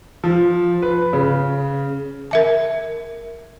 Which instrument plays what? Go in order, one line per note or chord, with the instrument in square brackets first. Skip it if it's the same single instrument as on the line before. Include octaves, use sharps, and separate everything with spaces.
[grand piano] F3
B4
C#3
[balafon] A#4 E5 A5